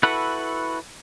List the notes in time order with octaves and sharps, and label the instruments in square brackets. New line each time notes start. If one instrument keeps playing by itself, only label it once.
[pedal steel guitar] E4 F#4 A4 B4 F#5